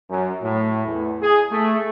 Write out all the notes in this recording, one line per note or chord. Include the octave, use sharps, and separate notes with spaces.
F#2
A2
E2
G#4
A3